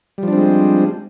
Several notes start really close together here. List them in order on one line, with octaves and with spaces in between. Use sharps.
G3 F3 D4 C4 G#3